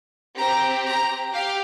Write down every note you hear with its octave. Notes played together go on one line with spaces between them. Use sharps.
C4 G4 A#5
A#5
G4 F5